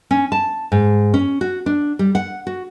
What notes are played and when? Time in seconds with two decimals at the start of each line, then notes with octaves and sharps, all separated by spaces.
0.11 C#4
0.32 A5
0.72 G#2
1.14 C#4
1.41 F#4
1.66 D4
1.99 G3
2.15 F#5
2.47 F#4